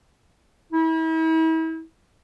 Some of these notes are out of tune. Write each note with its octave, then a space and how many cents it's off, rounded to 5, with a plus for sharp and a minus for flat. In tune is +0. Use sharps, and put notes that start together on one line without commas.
E4 -40